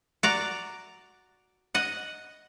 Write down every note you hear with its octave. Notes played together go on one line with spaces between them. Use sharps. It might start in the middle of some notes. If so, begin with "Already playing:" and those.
F#4 D5 A#5
D#5 F#5